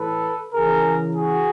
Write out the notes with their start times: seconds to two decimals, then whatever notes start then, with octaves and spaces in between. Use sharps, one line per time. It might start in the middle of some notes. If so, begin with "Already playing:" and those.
Already playing: A2 E3 A4 B4
0.53 C#3 E3 G#4 A#4
1.15 F#4 G#4